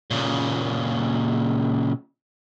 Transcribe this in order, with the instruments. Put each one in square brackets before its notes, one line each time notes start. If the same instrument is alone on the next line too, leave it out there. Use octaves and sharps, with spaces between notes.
[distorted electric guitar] A#2 C#3